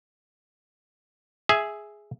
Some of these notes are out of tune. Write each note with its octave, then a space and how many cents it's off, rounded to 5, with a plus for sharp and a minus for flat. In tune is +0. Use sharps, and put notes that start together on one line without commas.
G#4 +0 E5 +0